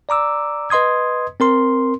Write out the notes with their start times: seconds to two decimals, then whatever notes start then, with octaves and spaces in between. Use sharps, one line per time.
0.09 D5 A#5 D6 E6
0.70 B4 D#5 C6 D#6 G#6
1.40 C4 A#4 C6